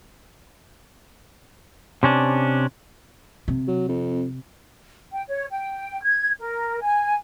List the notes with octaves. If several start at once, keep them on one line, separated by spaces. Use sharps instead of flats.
C3 C#4 D4
C3
F#3
F2
G5
C#5
G5
G#6
A#4
G#5